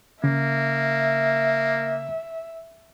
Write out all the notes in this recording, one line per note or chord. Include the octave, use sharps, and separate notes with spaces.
C#3 A#3 E5